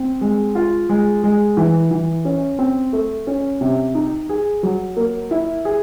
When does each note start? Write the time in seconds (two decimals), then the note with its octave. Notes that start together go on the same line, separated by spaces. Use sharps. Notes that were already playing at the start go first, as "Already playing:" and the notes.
Already playing: C4
0.21 G#3
0.55 F4
0.89 G#3
1.24 G#3
1.57 E3
1.91 E3
2.25 C#4
2.59 C4
2.93 A3
3.27 C#4
3.61 C3
3.95 D#4
4.29 G#4
4.63 F#3
4.97 A#3
5.31 E4
5.65 G#4